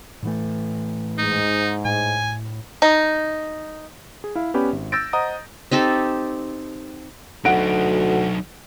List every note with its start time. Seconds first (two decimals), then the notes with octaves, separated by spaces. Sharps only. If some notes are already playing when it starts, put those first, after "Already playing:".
0.22 A2 E3 A3
1.18 G#2 D#4
1.85 A2 G#5
2.82 D#4
4.24 G#4
4.35 E4 F5
4.54 B3 C#4 G4 B4 D5 B5
4.73 G#1
4.92 E6 G6 A6 A#6 D7
5.13 C5 D#5 F#5 A#5 D#6
5.71 C4 D#4 G4 A4
7.45 D2 F#3 D#4 F#5 D7